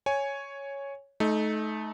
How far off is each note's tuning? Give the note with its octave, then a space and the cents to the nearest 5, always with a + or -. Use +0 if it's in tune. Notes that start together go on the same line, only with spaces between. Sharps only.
C#5 +0 G#5 +0
A3 -30 D#4 +0